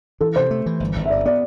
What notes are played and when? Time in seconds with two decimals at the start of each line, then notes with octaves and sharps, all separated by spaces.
0.21 E3 A4
0.36 C3 C5
0.51 A3
0.66 E3
0.80 G1
0.96 G1
1.06 E5
1.10 G2 D5
1.25 B3 D5